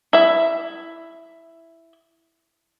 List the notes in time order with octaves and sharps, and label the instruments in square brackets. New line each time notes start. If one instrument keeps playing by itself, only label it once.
[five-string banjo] E4 E5